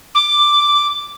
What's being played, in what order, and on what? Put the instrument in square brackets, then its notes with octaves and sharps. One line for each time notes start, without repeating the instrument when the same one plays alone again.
[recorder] D6